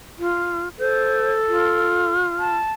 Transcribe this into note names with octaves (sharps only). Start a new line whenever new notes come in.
F4
A4 C5
F4
A5